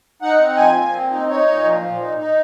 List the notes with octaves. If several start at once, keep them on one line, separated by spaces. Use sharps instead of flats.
D#4 F#5
C4
F3 G#5
A#2
C4
D#4
D#4 C#5
A#2
F3
A#2
D#4
D#4